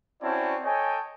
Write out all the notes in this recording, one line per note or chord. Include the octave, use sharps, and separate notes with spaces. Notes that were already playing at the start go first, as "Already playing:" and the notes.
C4 C#4 E4 F#4 D5 A5
A4 C#5 D#5 G5 G#5